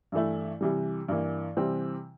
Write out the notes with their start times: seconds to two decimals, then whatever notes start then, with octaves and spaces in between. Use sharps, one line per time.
0.12 G2 E3 A3 E4
0.61 C3 E3 G3
1.08 G2 E3 A#3
1.57 C3 E3 G3 C4